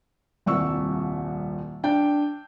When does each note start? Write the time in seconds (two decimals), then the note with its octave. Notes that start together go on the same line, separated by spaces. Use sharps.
0.46 D#1 C2 C#6 E6
1.84 D4 G5